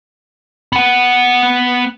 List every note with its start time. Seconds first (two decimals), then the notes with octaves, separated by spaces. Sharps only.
0.73 B3 F#5